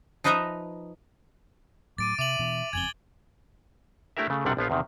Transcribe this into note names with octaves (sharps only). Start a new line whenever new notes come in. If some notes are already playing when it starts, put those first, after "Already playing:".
F3 D#4 B4 D#5 E5 A#5
A2 F#3 D6 A6 D7 D#7
C3 E5 D6 D#7 F#7
B2 E3
F#1 F2 C4 G#5 G#6 F#7 G7
A3 D4 E4 G4 A#4 E5
C#3 A3
B1 F#2 C3 G3 D4 F#5
A#1 F3 B3 F4
E2 C3 D#3